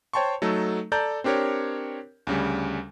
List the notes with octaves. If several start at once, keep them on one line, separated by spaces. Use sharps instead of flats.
C5 C#5 G5 A5 C6 C#6
F#3 A3 D#4 A4
A4 D5 A5 A#5 G6
C4 D4 G4 A#4 C#5
D2 C#3 G3